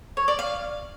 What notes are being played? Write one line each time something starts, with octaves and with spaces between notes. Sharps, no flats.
C#5
D5
F5